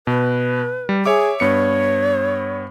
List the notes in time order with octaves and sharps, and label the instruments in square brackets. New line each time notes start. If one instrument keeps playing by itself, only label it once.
[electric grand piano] B2 [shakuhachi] B4
[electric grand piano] G3
[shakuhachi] G#4 [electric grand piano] C#5 E5 D6
[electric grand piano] G2 B3 C#7 [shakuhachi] C#5